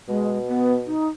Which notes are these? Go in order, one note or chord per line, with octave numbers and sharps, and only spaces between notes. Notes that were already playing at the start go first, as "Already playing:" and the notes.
B2 G#3
B3
D#4